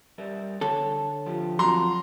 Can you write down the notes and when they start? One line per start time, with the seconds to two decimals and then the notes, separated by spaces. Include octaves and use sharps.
0.18 G3 A#4 E5
0.61 D3 A4 C#5
1.26 F3 F4 G4
1.59 F2 F#3 F4 F#4 A#5 C6